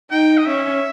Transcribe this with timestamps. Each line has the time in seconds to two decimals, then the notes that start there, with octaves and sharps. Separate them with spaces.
0.11 D#4 G5
0.38 D#5
0.46 C#4 E5